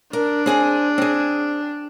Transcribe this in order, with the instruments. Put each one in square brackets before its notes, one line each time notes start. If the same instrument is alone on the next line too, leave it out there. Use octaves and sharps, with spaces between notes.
[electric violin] D4 [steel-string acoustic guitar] A#4
[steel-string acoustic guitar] C4 G#4 G#5
C4 G#4